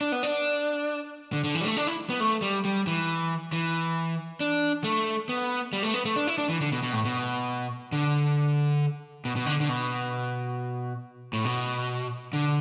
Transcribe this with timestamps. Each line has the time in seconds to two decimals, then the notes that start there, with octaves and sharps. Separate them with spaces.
0.01 D4
0.12 B3
0.23 D4
1.33 D3
1.44 D3
1.55 E3
1.61 G3
1.66 A3
1.77 D4
1.87 E4
2.10 B3
2.20 A3
2.42 G3
2.65 G3
2.87 E3
3.52 E3
4.40 D4
4.84 A3
5.29 B3
5.73 G3
5.83 A3
5.94 B3
6.05 A3
6.16 D4
6.27 E4
6.38 D4
6.49 E3
6.61 D3
6.72 B2
6.82 B2
6.93 A2
7.05 B2
7.92 D3
9.25 B2
9.36 B2
9.46 D3
9.60 D3
9.69 B2
11.33 A2
11.45 B2
12.33 D3